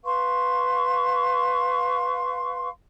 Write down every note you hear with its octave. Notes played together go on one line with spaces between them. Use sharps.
B4 F5 C6 C#6